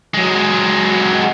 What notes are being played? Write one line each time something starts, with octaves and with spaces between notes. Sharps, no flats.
F#3 G#3